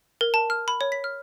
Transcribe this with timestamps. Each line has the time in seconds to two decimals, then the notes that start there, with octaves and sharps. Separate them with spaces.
0.21 A#4
0.34 A5
0.50 F6
0.68 B5
0.81 C#5
0.92 B6
1.04 F6